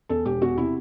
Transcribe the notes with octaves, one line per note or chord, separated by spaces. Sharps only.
E2 A4
E1 G4
E2 F#4
C3 E4